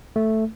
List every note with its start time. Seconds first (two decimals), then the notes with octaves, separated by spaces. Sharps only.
0.16 A3